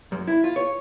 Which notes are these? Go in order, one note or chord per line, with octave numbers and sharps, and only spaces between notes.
F#2
E4
F4
C#5